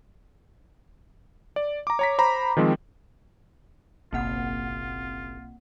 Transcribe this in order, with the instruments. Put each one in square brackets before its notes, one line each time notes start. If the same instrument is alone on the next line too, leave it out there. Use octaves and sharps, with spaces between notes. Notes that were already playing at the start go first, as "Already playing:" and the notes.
[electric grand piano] D5
A#5 D6
C#5 A#5 B6
C5 A#5 B5
D#3 F3 G#3 C4
[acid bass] F#1 [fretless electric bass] B1 [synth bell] A#3 C4 F#5 [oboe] F4